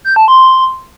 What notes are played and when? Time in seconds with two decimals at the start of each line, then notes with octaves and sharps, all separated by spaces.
0.05 G6
0.16 A5
0.28 C6